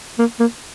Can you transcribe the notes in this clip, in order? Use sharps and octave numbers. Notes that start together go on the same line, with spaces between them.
A#3
A#3